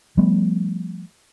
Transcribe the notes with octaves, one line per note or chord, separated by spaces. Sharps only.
F3 G3 A3 B3